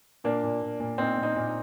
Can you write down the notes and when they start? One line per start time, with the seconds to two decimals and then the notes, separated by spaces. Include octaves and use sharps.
0.24 A#2 A#3 D4
0.43 A#2
0.62 A#2
0.80 A#2
0.98 A#2 C4 D#4
1.17 A#2
1.23 C4 D#4
1.36 A#2
1.48 D#4